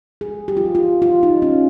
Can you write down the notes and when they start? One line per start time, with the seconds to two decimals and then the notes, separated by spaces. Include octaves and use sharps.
0.21 G#4
0.48 G4
0.57 F4
0.65 G4
0.75 F4
1.02 F4
1.23 D#4
1.42 C#4